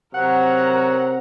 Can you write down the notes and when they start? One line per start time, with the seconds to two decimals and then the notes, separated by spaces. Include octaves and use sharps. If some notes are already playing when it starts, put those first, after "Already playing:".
0.14 C3 F#3 A#4 F#5 A#5